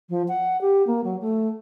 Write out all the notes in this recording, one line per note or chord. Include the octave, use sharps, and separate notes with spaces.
F3
F#5
G4
A#3
F#3
A3